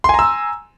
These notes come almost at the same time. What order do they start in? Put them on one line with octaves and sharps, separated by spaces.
C6 G#5 A#5 E6